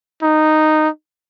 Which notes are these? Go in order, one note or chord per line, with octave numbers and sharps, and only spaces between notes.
D#4